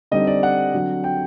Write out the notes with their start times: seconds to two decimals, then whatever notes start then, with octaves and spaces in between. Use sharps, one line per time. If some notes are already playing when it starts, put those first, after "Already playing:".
0.11 D3 G3 C4 D#4 D#5
0.27 D5
0.43 F#5
0.74 D3 F#3 C4
1.04 G5